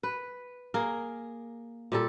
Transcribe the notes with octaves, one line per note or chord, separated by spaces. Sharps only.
B4
A#3 G#4 A#4
A#2 G3 A4